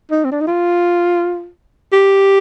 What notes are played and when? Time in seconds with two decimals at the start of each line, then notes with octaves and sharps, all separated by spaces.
0.11 D#4
0.25 C4
0.31 D4
0.40 D#4
0.47 F4
1.93 G4